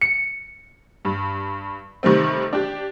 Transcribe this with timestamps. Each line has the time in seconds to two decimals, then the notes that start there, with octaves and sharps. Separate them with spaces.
0.01 C#7
1.05 G2
2.03 C3 D#3 G3 A3 C4
2.53 D4 G4